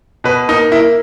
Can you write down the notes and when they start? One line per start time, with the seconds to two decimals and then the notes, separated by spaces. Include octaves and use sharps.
0.24 B2 B4
0.49 A#3 D#4
0.72 A#3 E4